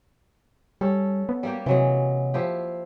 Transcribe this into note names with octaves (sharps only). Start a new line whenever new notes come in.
G3 C#4 A4
B3
G3 A#3 G4
C3 E3 F#3 G#3
F3 E4 G4